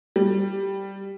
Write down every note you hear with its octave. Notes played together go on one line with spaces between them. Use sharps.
G3